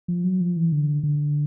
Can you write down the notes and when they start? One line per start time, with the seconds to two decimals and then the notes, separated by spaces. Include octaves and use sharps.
0.08 F3
0.24 F#3
0.41 F3
0.56 E3
0.72 D3
1.03 D3